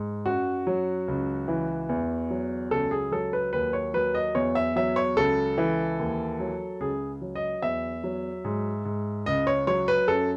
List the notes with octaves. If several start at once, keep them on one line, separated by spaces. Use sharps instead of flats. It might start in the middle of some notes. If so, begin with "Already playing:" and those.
Already playing: G#2
F#2 F#4
F#3
C#2
E3
E2
F#3
C#2 A4
G#4
F#3 A4
B4
D#2 B4
C#5
F#3 B4
D#5
E2 C#5
E5
F#3 E5
C#5
C#2 A4
E3
D#2
F#3
C#2 G#4
F#3
D#5
E2 E5
F#3
G#2
G#2
C#2 D#5
C#5
F#3 C#5
B4
F#2 A4